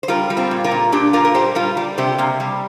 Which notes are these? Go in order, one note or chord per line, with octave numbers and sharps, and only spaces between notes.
C5
G3 F4 A#4
G3
C4 F4
A#2
F4 A#4
A#2
A#2 D4 G4
A#2 F4 A#4
A#4
G3 G4 C5
G3 F4 A#4
G3
C3 G4 C5
C3 A#3
G3